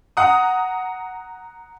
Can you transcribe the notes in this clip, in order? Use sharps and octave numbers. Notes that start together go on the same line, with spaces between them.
F#5 A#5 D#6